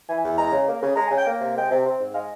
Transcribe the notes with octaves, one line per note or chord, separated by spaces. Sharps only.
E3 G#5
E2
G#3 A#5
C#3
A#3
C#3
G#3 A#5
G#5
C#3
G5
A#3
C3
G#3 G5
C3
C4
G#2
G#3 F5